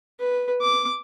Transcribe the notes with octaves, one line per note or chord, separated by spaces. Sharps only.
B4
D6